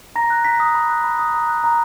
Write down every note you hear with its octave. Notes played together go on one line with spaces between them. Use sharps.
A#5 A#6
F#6
A#5 B6
D#6
B5
F#6
B5
D#6
A#5
F#6
A#5